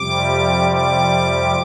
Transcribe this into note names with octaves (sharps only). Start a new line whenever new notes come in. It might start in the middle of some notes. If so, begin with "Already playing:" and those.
Already playing: F2 C3 G3 D6
D6